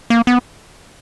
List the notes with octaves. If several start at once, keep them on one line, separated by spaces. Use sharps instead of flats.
A#3
B3